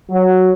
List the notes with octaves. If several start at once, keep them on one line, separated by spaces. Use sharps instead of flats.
F#3